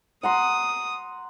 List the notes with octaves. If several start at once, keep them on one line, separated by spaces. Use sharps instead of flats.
F#5 A#5 C6 D#6